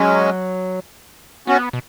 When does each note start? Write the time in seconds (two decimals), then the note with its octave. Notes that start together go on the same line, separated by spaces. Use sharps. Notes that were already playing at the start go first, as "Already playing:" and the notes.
Already playing: F#3 G#3 C#4
1.47 B3 C#4 F#4
1.73 B2